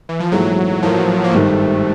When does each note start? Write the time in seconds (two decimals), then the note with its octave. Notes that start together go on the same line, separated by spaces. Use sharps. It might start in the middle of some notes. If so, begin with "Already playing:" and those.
0.09 E3
0.20 F3
0.32 A#1 G#2 E3 F#3 A3
0.82 A2 F3 F#3 A#3
1.24 A#3
1.32 G#1 G2 D#3 A3